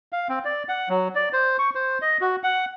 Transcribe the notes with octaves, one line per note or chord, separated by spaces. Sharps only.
F5
C4
D5
F#5
F#3
D5
C5
C#6
C5
D#5
F#4
F#5